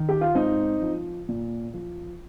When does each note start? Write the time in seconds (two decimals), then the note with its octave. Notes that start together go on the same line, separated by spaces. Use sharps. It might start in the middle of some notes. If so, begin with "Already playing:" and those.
Already playing: D#3
0.09 G4
0.21 F4
0.35 G#2 C4 D#4
0.82 F3
1.29 A#2
1.74 F3